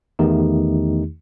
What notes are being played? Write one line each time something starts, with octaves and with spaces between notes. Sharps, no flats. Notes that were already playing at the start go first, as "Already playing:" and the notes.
E2 D#3 A3 D#4 G4